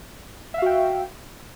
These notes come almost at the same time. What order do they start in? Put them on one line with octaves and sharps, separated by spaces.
E5 F5 F#4 G5